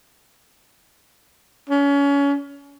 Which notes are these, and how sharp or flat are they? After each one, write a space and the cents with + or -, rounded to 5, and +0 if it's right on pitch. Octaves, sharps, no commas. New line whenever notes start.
C#4 +30